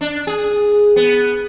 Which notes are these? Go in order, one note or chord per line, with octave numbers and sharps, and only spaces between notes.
D4
G#4
B3